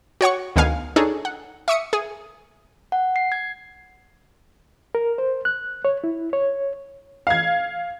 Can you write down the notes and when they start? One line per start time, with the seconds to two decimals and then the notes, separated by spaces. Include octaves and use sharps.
0.21 F#4 C#5 F#5 C#6
0.56 D2 D#3 B3 F5 G#5
0.96 D4 D#4 G#4 A4 C#5
1.25 F#5
1.68 E5 C#6 D#6 C#7
1.93 G#4
2.92 F#5
3.16 C7
3.32 G#6
4.95 A#4
5.18 C5
5.45 F#6
5.85 C#5
6.04 E4
6.33 C#5
7.27 F5 G#6